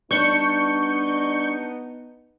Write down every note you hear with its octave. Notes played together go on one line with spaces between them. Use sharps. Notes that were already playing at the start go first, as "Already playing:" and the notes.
G3 B3 D4 D#4 C#6 G6 C#7